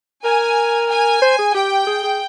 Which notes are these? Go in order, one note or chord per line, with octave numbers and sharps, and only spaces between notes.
A#4 G#5
G#5
C5
G#4
G4 G5
G#4
G#4